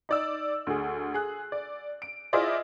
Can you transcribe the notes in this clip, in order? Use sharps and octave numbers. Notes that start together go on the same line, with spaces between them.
D#4 D5 E6
D2 G#4
G#4 F#6
D5
D7
E4 F4 G#4 C5 D5 D#5